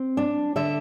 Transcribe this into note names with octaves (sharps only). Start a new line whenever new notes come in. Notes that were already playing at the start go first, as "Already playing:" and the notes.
Already playing: C4
D4
D3 E5